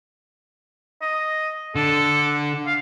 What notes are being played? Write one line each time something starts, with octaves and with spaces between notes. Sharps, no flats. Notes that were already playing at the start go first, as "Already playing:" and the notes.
D#5
D3 A4
F5